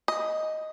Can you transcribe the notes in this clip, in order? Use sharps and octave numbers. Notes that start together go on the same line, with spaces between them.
D#5